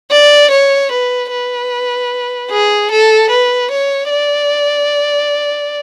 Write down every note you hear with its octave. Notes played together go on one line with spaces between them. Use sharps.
D5
C#5
B4
B4
G#4
A4
B4
C#5
D5